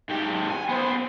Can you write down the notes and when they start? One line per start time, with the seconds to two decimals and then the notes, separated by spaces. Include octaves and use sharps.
0.09 G#2 G4
0.50 G#5
0.69 B3 C5